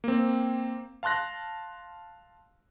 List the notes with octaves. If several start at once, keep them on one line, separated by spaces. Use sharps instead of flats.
A#3 C4
F5 A5 C6 F#6 A#6